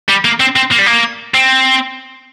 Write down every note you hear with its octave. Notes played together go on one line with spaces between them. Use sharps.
G3
A#3
C4
C4
A#3
G3
A#3
C4